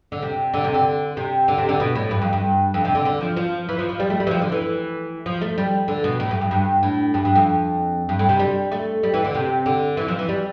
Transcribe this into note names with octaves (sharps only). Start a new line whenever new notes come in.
D3
C3
D3
C3
D3
C3
D3
C3
D3
B2
A2
G2
F2
G2
F2
C3
D3
D3
F3
F3
E3
F3
F3
G3
A3
G3
E3
F3
D3
E3
F3
A3
G3
D3
B2
A2
G2
F2
G2
A2
G2
G2
F2
G2
A2
C3
G3
A3
G3
E3
D3
C3
D3
E3
F3
E3
G3